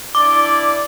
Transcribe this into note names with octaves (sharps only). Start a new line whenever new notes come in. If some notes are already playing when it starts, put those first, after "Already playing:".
D4 E4 D5 D6